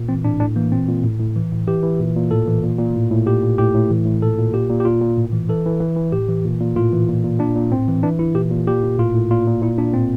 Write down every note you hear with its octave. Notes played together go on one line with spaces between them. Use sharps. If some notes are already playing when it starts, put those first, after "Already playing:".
Already playing: A#2
E3 C4
A2 D4
A2 D4
E3 A#3
A#2 C4
A#2
A2
A2
E3
A2
E3 G4
E3
A#2
A#2
A2 A4
E3
A#2
A#2
A2
A2
A#2 G4
A#2
A2 G4
A2
E3
A2
A#2 A4
A#2
A#2 G4
A#2
G4
A#2 F4
A#2
A2
E3
E3 A4
E3
E3
E3
A2 G4
E3
A#2
A#2
A2 F4
E3
A#2
A#2
A#2 D4
A#2
A2 C4
E3
E3 D4
E3 E4
A#2 G4
A#2
A#2 G4
A#2
A2 F4
A2
A#2 F4
A#2
A#2 E4
A#2 D4
A2 C4